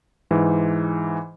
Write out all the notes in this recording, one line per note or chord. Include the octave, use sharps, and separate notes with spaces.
G#2 E3